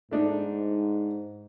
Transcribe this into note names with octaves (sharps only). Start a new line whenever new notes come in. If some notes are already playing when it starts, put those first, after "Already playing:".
G#2 A3 D4 D#4